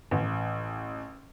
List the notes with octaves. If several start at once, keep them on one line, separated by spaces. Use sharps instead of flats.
A1